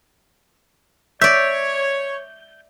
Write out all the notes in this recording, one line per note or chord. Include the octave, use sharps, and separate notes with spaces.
C#5 D5 E5 G6